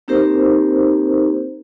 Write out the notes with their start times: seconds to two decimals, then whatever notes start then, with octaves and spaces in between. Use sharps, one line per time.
0.08 A#3 C4 D#4 G4 A#4 C5